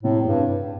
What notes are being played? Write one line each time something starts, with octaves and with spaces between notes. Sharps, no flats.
A2 C3
E2
G2
D4